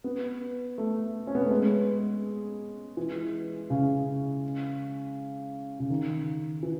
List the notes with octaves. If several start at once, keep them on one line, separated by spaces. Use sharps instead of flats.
B3
A3
C#4
B3
A3
G#3
E3
C#3
C#3
D#3
E3